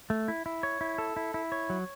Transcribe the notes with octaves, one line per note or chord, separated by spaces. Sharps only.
A3
E4
E4
C#5
E4
A4
E4
E4
C#5
F#3